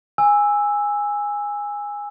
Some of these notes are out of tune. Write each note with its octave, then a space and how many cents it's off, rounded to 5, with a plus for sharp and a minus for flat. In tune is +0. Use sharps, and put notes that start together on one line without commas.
G#5 -10 E6 +0